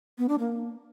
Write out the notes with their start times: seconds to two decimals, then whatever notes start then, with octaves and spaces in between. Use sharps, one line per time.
0.18 B3
0.29 D4
0.39 A#3